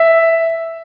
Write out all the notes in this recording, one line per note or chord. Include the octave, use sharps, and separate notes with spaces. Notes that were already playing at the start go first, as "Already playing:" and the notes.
Already playing: E5